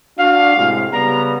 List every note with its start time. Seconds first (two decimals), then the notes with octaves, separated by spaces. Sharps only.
0.18 D4 F#4 F5
0.56 A2 C3 G#3
0.93 C#3 G3 B3 A#5